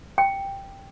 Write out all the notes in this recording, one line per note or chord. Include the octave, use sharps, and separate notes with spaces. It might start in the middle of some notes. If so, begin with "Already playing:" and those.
G5